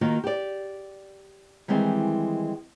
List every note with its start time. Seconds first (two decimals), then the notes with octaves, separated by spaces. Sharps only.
0.01 D#3 A#3 F4 F#4
0.24 G4 D5
1.68 D#3 E3 G3 G#3 C4